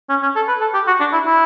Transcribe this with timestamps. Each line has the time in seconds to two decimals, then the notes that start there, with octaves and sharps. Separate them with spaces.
0.09 C#4
0.22 C#4
0.36 A4
0.48 B4
0.61 A4
0.74 G4
0.87 F#4
1.00 D4
1.13 E4
1.26 E4